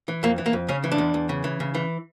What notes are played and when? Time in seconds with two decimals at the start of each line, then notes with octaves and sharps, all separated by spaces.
0.08 E3
0.23 F2 A#3
0.38 E3
0.46 A#3
0.53 F2
0.68 C#3 C#4
0.84 E3
0.91 D4
0.98 E2
1.14 E2
1.29 C#3
1.44 E3
1.60 C#3
1.74 E3